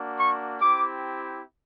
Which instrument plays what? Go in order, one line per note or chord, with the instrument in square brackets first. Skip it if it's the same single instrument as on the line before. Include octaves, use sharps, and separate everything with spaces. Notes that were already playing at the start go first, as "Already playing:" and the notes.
Already playing: [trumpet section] A#3 D4 F#4
C#6
C4 E4 G4 D6